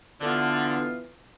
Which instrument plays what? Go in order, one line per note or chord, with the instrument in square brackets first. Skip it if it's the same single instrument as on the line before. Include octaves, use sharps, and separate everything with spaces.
[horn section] D3 [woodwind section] E3 B3 F4